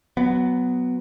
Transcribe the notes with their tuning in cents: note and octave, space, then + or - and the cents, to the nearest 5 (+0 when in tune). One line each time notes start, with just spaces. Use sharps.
F#3 +0 B3 +10